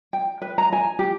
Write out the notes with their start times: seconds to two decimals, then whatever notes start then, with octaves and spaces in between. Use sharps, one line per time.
0.13 G5
0.42 B4
0.58 A#5
0.73 G#5
0.99 G4